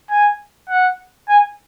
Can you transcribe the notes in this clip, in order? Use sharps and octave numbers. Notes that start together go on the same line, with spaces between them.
G#5
F#5
G#5